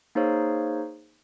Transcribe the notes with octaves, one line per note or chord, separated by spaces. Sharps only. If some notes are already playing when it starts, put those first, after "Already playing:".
A#3 D#4 G#4 C5 C#5 F5